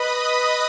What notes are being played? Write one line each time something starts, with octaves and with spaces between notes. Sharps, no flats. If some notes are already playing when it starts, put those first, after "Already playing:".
Already playing: B4 D#5 B5 D#6
D#5 D#6